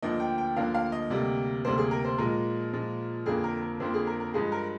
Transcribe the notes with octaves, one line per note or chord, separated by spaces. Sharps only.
D2 D3 F3 A#3 D#5
G5
G5
D2 D3 F3 A#3 F5
F5
D#5
D2 C3 G3 A#3
D2 C3 G3 A#3 C5
G#4
A#4
C5
A#2 F3 G#3 A#4
A#2 F3 G#3
F2 D3 F3 A#3 G#4
A#4
A#4
F2 D3 F3 A#3 C5
G#4
A#4
A#4
G2 F3 G#3 G#4
A#4